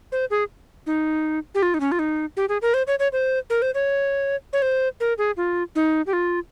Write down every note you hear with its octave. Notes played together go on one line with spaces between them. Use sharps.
C5
G#4
D#4
G4
F4
D#4
C#4
F4
D#4
G4
G#4
A#4
C5
C#5
C#5
C5
A#4
C5
C#5
C#5
C5
A#4
G#4
F4
D#4
G4
F4